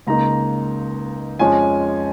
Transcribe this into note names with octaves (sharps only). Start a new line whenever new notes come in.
C#2 C#3 A#3 D#4 A#5
F2 F3 G#3 C#4 G#5